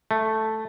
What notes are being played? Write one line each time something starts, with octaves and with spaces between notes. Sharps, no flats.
A3